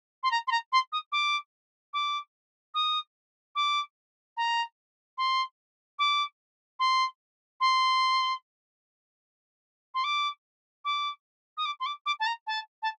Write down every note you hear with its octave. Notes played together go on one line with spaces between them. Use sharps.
C6
A#5
C6
A#5
C6
D#6
D6
D6
D#6
D6
A#5
C6
D6
C6
C6
C6
D6
D6
D#6
D6
C6
D6
D6
A5
A#5
A5
A5